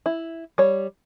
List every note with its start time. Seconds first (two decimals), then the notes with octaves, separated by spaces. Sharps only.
0.06 E4
0.58 G3 C#5